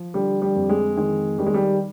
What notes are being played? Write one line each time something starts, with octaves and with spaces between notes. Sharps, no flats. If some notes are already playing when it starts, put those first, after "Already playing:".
Already playing: F3
D3 G3
G3
F2
G#3
D#3 G#3
D#3 G3
G#3
G3